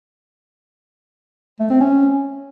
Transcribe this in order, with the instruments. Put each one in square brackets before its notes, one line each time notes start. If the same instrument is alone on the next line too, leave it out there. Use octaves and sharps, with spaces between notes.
[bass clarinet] A3
C4
C#4